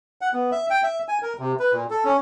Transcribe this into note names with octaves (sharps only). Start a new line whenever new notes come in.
F#5
B3
E5
G5
E5
G#5
A#4
C3
B4
A#2
A4
C#4